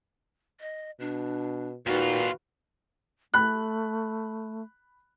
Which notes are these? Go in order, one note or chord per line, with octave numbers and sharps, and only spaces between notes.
D#5
B2 D4
D#2 A#2 D#4 F4 F#4 B4
A3 B5 F#6